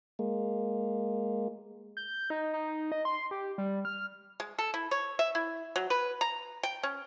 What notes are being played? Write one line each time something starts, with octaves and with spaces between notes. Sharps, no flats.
G#3 A#3
G6
D#4
D#4
D#5
C6
G4
G3
F6
G#3
A4
E4
C#5
E5
E4
F#3
B4
A#5
G5
C#4